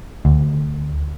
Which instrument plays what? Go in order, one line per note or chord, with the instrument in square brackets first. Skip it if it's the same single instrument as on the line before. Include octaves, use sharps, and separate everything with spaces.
[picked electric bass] D2